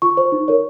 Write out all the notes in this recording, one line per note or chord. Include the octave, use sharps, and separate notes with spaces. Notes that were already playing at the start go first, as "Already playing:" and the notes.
F4 C#6
C5
D#4
A#4 C#5